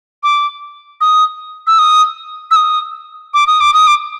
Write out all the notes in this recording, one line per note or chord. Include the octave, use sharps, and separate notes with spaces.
D6
D#6
E6
D#6
E6
D#6
D6
D#6
D6
D#6
D6